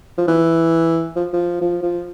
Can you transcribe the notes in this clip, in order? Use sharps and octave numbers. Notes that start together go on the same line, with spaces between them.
F3
E3
F3
F3
F3
F3